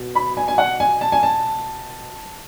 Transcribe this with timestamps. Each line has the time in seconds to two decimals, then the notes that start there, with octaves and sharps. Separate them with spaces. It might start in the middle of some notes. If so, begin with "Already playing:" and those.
Already playing: B2
0.15 B5
0.37 G#5
0.48 G#5
0.58 F#5
0.80 G#5
1.01 A5
1.12 G#5
1.23 A5